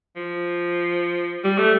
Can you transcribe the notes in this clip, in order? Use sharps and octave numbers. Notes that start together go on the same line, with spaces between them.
F3
G3
A3